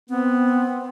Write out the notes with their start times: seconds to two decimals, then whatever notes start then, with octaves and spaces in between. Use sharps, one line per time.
0.09 B3 C4